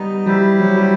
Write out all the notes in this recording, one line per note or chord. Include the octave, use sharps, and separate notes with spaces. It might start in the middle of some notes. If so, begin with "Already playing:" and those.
Already playing: G3 B3 D#4 D#5
G3 E4 G4 C5
F#3
G3